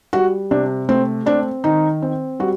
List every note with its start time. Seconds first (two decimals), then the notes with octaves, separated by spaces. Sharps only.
0.13 G3 F#4
0.51 C3 D4
0.89 A3 C4
1.26 C4 D4
1.64 D#3 D#4
2.02 C4
2.40 G3 F#4